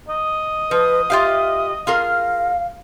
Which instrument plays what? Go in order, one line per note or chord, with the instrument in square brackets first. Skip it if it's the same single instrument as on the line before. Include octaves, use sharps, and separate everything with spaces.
[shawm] D#5
[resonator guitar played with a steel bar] F3 [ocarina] B4
[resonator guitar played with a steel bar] F4 G4 F5 [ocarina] E5
[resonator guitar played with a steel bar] F4 G#4 A#4 [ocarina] F5